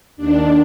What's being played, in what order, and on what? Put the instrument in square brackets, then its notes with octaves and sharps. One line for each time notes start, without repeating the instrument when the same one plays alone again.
[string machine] D#2 D#3 D4